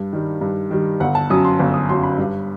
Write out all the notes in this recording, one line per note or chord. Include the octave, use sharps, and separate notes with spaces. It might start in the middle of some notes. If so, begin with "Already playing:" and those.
Already playing: G2
D#3 G3
G2
D#3 G3
G1 F#5
A5
F#2 F#3 D#6
C6
G1
D#6
F#2 F#3 C6
B5
G2